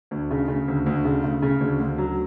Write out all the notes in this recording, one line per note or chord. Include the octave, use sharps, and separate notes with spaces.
D2
C#3
C#3
D2
D2
C#3
C#3
C#3
D2
D2
F#3